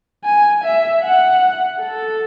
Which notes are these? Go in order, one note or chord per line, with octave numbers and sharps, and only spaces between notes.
G#5
E5
F#5
A4